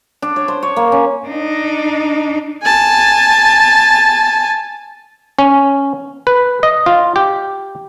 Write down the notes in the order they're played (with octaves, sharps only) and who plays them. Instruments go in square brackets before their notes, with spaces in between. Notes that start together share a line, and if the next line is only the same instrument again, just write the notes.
[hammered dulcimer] D4
C#5
C5
C#5
A#3
C#4
[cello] D4 D#4
[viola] G#5 A5
[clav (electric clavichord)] C#4
B4
D#5
F4
G4